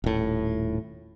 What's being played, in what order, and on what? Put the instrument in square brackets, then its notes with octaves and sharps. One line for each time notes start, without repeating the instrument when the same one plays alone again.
[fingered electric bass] D#1 A2